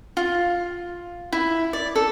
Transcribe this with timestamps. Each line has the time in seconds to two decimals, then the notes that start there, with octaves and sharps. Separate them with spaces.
0.17 F4
1.33 E4
1.73 D5
1.96 A4